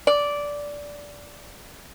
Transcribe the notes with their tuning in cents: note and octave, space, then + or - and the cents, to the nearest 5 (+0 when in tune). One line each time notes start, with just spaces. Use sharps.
D5 -10